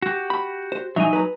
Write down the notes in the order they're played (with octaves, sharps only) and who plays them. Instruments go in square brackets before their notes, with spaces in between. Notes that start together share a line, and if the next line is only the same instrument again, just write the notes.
[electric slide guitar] F#4 G4
[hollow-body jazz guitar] B5
C5
[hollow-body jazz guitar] B1 E3 E5 [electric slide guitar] F#3 D#4 G#5
[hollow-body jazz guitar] B4 A#5